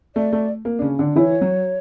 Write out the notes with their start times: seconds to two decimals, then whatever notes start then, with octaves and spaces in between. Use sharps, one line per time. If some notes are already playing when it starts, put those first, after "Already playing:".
0.15 A3 D5
0.33 A3
0.65 A#3
0.79 D4
0.82 C#3 C#4
0.99 D3 D4
1.16 E3 E4 C#5
1.41 F#3 F#4